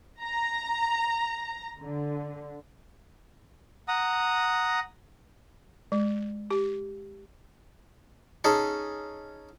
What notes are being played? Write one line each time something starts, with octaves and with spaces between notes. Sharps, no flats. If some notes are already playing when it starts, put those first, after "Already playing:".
A#5
D3
F#5 A#5 D#6
G#3
G4
C#4 D#4 G#4 A4